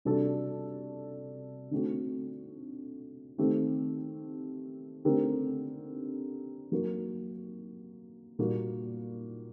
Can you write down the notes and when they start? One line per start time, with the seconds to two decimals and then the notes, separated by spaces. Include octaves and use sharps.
0.05 C3 G3 D4 F#4 A4
1.71 D3 A3 C4 F#4
3.38 D#3 A3 C4 G4
5.05 D3 A3 C4 G4 A#4
6.72 F#3 A#3 F#4 A#4
8.39 A#2 G3 A#3 F#4